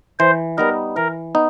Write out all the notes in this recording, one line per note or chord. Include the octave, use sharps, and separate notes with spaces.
E3 C5
G3 B3 D#4 A#4
E3 A#4
B3 D#4